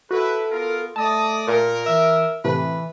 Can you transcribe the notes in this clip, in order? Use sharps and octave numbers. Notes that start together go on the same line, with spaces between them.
E4 F#4 A4 B4
B3 F4 A#4
A3 D5 D#5 A5 D#6
A#2 A#4
E3 E5
A2 C3 E3 A3 B4